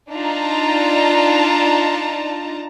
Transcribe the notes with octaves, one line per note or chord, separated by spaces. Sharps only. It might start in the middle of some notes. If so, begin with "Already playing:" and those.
D4 D#4 F4 A5 A#5